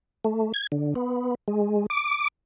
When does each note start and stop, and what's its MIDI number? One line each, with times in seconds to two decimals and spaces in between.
0.24 0.52 57
0.54 0.67 92
0.72 0.94 50
0.95 1.35 59
1.48 1.86 56
1.90 2.28 86